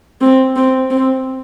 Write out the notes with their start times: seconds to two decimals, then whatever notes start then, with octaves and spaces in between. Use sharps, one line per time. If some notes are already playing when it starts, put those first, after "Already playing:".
0.21 C4
0.56 C4
0.91 C4